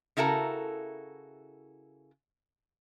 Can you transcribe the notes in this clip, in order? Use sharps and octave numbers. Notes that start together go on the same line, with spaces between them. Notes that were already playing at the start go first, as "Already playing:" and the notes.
C#3 E4 F#4 A4 A#4